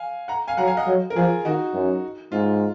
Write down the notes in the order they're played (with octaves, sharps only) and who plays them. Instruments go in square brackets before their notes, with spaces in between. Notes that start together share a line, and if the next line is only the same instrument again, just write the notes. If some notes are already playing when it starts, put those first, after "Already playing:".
Already playing: [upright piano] F5 G#5
F#5 A#5
F5 G#5
[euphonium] F#3 [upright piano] F#5 A#5
[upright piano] F5 G#5
D#5 F#5
[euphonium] F#3
[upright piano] A#4
[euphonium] F3 [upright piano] F4 G#4
[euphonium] D#3 [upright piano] D#4 F#4
[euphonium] F#2
[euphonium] G#2 [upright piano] F4